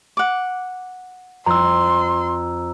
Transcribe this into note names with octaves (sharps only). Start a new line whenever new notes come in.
F#5 D6
F2 A#5 C6 E6